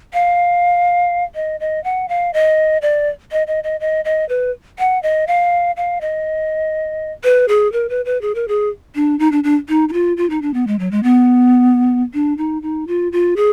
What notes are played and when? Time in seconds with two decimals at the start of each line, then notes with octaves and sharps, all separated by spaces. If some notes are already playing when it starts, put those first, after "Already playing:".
0.14 F5
1.35 D#5
1.60 D#5
1.84 F#5
2.09 F5
2.34 D#5
2.82 D5
3.32 D#5
3.47 D#5
3.64 D#5
3.80 D#5
4.05 D#5
4.29 B4
4.79 F#5
5.03 D#5
5.28 F5
5.77 F5
6.01 D#5
7.24 B4
7.48 G#4
7.72 A#4
7.89 B4
8.05 B4
8.22 G#4
8.35 A#4
8.48 G#4
8.95 D4
9.19 D#4
9.32 D4
9.44 D4
9.69 D#4
9.89 D#4
9.93 F4
10.17 F4
10.30 D#4
10.42 D4
10.54 B3
10.67 G#3
10.79 F#3
10.91 G#3
11.03 B3
12.14 D4
12.38 D#4
12.62 D#4
12.87 F4
13.12 F4
13.36 G#4